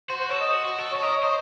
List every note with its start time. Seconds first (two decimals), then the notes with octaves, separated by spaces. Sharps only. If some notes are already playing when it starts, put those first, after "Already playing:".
0.09 F#4 C5
0.20 C5
0.30 A4 C#5
0.40 D#5
0.51 F#4
0.65 F#4
0.78 A4
0.92 C#5
0.95 A4
1.02 A#4 D#5
1.12 C#5
1.23 C5 D#5